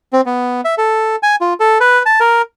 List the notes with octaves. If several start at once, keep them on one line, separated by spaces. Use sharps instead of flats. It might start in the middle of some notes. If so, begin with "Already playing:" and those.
C4
B3
E5
A4
G#5
F4
A4
B4
A5
A#4